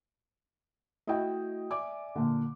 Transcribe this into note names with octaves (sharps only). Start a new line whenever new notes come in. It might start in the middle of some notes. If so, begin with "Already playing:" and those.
A3 E4 F#4 D#5 G5
D5 E5 G#5 D6
A#2 D3